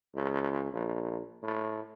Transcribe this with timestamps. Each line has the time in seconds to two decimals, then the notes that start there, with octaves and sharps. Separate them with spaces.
0.15 C#2
0.72 A#1
1.43 A2